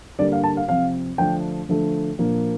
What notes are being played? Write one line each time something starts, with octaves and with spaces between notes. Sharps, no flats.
D3 G3 A#3 D4 D5
F5
A5
F5
C3 F3 C4 F5
D3 F3 A3 D4 G5
D3 F3 A3 D4
A#2 F3 A#3 D4